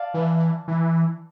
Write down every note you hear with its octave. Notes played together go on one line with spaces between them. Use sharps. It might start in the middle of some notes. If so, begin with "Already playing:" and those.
Already playing: D5 F5 A5
E3
E3